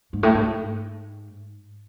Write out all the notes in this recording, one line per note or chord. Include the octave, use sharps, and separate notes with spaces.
G#2
A2
G#2